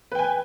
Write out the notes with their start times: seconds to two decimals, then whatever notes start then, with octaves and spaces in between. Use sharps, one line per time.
0.12 B4
0.15 G5
0.19 G#5